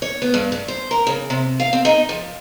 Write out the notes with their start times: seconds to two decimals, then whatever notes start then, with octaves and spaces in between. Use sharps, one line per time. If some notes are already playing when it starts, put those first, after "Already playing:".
0.02 C#5
0.22 B3
0.34 G2
0.52 G2
0.68 C5
0.91 A#4
1.07 C#3
1.30 C3
1.60 F5
1.73 C4
1.85 D#4
2.09 F3